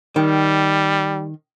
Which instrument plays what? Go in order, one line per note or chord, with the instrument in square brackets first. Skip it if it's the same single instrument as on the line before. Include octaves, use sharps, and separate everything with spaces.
[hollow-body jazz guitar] D#3 [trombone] G3